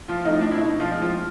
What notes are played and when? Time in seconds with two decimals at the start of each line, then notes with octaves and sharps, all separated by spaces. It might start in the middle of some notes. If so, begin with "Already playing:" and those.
0.08 F3 F4
0.25 F3 A3 C4 D#4
0.41 D4
0.51 E4
0.57 B2 D#4
0.80 F3 F4
0.90 G#3 C4
1.02 F3 F4